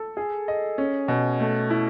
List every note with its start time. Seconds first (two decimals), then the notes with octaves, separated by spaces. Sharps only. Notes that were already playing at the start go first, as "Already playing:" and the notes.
Already playing: A4
0.17 G#4
0.48 D#5
0.78 C#4
1.08 B2
1.40 A3
1.70 E4